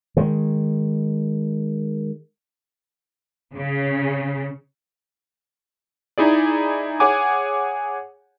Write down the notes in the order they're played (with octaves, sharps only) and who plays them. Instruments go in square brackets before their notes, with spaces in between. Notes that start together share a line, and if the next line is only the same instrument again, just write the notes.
[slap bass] D#3 G#3
[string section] C#3
[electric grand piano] D#4 E4 G#4 D5
G#4 C#5 F#5 G#5 D6